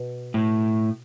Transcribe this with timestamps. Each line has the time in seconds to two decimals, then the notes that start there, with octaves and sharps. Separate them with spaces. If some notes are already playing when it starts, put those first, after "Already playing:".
Already playing: B2
0.34 A2